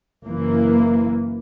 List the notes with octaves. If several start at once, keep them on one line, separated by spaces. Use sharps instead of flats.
F#1 E3 A#3